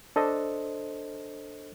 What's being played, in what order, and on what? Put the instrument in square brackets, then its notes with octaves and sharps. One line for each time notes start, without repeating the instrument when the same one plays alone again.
[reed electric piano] D4 A4 C5 D#5